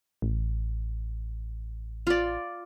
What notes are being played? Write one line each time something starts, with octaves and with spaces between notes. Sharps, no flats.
A1
F4 D5